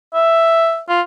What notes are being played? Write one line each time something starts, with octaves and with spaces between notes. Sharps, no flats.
E5
F4